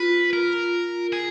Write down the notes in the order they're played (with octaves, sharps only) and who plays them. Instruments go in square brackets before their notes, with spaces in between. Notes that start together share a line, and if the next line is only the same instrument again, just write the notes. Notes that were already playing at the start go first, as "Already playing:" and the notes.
Already playing: [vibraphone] F4 [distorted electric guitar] B4
[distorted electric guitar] A#4
G#4